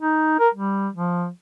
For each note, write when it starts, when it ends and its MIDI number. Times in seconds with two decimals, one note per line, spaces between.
0.01 0.38 63
0.40 0.49 70
0.55 0.88 55
0.95 1.28 53